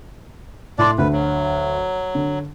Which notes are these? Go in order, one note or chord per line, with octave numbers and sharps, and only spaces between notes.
A2 D4 D5 C6
D2 B4
F#3
D3